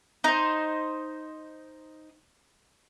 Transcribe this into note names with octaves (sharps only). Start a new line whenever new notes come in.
D#4 C5